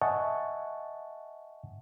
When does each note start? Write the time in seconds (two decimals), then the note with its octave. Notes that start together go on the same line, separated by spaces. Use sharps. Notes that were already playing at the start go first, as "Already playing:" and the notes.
0.02 D#5 E5 F#5 G#5 A5 C#6